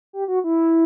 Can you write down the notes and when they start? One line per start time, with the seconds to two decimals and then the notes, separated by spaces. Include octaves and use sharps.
0.13 G4
0.28 F#4
0.44 E4